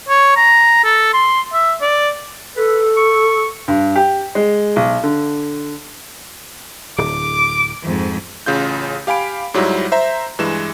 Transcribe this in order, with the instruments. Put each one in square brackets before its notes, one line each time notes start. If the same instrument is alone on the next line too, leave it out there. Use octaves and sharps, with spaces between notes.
[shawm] C#5
A#5
A4
C6
E5
D5
[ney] A4 [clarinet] B4
[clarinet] C#6
[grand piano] G2
G4
G#3
B1
D3
[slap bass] D1 [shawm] D6
[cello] F2 G#2
[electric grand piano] A1 C#3 F4 G6
G4 F5 G#5 B5 D7
G#2 F#3 G3 E4
C5 E5 A#5
G2 E3 G#3 E7